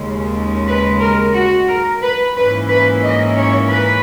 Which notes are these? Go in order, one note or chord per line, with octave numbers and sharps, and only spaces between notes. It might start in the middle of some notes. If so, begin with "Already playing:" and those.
Already playing: D#2 C#3 G#3
B4
A#4
F#4
A#4
B4
G#2 E3 A#3 C#4 E4 B4
B4
D#5
C#5
B4